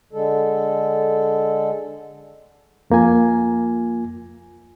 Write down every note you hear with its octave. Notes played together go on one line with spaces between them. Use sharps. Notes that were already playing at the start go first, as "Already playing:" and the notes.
D3 G#3 A4
F2 A#3 F4 G#5